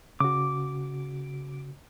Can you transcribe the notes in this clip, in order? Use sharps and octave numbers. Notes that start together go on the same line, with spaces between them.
C#3 F#4 D6